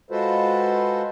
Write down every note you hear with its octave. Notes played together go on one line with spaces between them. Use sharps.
G#3 F4 F#4 A4 B4 C5